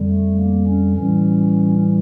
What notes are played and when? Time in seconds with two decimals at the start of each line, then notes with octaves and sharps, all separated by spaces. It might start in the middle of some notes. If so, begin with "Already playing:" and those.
Already playing: F2 D3 G3
0.09 A3
0.38 A#3
0.67 C#4
0.96 A2 E3 G3 C#4